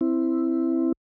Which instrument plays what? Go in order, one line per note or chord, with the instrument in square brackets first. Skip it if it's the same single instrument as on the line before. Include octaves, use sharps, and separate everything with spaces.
[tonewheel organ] C4 E4